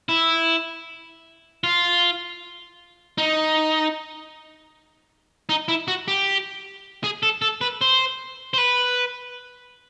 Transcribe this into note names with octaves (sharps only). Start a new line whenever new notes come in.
E4
F4
D#4
D#4
E4
F#4
G4
G#4
A4
A4
B4
C5
C5
B4